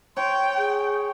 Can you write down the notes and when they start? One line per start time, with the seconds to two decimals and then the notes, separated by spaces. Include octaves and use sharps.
0.17 C#5 G5 C6
0.58 G#4